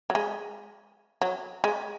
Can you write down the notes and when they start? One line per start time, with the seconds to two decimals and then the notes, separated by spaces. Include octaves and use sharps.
0.10 F#3
0.15 G#3
1.21 F#3
1.64 G#3